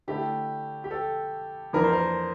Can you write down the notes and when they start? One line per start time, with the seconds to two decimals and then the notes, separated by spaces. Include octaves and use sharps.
0.07 D3 A3 E4 G4
0.84 G4
0.91 A4
1.73 F2 E3 A#3 D4 A#4
1.84 C5
1.93 A#4